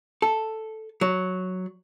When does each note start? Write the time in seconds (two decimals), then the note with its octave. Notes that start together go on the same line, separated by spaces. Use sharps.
0.22 A4
1.01 F#3